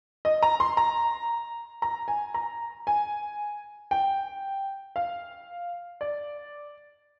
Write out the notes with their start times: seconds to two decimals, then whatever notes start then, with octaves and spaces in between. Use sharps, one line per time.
0.25 D#5
0.43 A#5
0.60 C6
0.77 A#5
1.82 A#5
2.08 G#5
2.34 A#5
2.87 G#5
3.91 G5
4.96 F5
6.01 D5